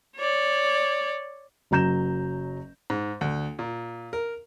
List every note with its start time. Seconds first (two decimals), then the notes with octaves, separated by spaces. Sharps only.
0.17 C#5 D5
1.71 F#1 F#3 A#5 G6 E7
2.90 G#2
3.21 D2
3.59 A#2
4.13 A#4